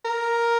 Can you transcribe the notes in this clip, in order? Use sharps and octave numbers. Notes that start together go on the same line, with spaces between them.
A#4